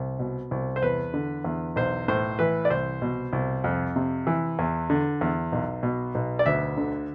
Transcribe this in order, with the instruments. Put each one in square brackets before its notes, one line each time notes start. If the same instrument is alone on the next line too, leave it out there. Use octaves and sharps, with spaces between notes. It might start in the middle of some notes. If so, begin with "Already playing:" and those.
Already playing: [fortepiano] C2
B2
C2
C5
E2 B4
D3
E2
B1 C5
A2 C5
E3 B4
D5
C2 C5
B2
C2
F2
C3
E3
E2
D3
E2
B1
B2
B1
D5
D2 E5
D3